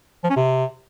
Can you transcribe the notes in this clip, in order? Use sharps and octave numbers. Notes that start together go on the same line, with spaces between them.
F3
C#4
C3